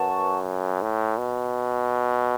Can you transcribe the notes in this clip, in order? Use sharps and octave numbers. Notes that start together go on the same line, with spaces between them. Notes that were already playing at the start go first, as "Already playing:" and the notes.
Already playing: F#2 B4 F#5 A5 C#6
A2
B2